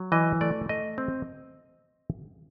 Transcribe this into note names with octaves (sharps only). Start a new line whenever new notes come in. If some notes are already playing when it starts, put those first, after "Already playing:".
Already playing: F#3
E3 D#5
A3 D5
A3 D#5
C4